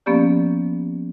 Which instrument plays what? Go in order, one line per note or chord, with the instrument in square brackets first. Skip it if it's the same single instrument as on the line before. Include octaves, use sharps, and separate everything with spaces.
[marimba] F3 A#3 B3 C#4 G4 D5